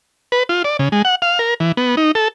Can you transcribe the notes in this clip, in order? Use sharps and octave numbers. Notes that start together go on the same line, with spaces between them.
B4
F4
D5
C#3
G#3
F#5
F5
A#4
E3
B3
D#4
A4